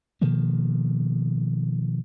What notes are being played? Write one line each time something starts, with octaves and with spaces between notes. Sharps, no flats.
B2 D#3 F3 A#3